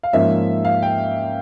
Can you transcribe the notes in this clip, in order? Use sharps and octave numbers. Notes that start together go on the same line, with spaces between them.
F5
G#2 F3 A#3 C#4 E5
F5
G5